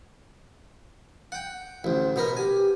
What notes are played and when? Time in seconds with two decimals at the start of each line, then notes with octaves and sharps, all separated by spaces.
1.32 F#5 G5
1.84 A1 D2 C5
2.16 B2 B3 A#4
2.37 G4 G#5